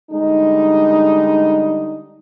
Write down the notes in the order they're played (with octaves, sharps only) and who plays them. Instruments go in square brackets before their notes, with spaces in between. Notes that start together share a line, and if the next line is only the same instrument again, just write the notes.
[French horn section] D3 G3 G#3 D#4